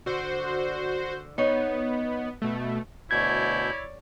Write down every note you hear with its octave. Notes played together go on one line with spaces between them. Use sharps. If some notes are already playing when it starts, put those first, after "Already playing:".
D3 F#4 C5
B3 D#4 C#5
B2 A3
D2 B2 E4 C#5 D5 G6 G#6